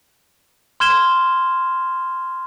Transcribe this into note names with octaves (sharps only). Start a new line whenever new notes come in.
C6 F6 G#6 E7 G7